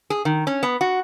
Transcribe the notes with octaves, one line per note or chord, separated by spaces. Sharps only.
G#4
D#3
C#4
B3
F#4